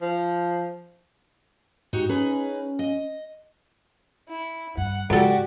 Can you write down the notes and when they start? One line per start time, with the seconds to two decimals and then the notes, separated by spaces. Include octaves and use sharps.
0.02 F3
1.93 G#2 D#4 F#4 G4
2.09 C#4 D#4 G#4 B4
2.79 D#5
4.29 E4
4.77 G2 F#5
5.10 C#2 G#2 F#4 G4 A4 D5